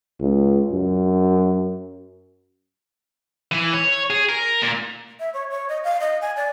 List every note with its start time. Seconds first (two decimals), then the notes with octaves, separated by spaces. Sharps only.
0.20 C#2
0.73 F#2
3.52 E3
3.73 C#5
4.10 G#4
4.29 A#4
4.62 A#2
5.20 E5
5.34 C#5
5.51 C#5
5.69 D#5
5.84 F5
6.00 D#5
6.22 G#5
6.37 D5